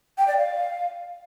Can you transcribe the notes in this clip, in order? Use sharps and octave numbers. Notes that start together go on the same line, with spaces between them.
G5
D5
F5